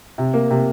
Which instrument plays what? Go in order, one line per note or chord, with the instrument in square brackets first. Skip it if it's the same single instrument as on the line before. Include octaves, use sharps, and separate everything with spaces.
[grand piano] C3
A#3
C3